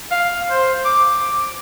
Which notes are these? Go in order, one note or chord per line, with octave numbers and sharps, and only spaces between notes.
F5
C5
D6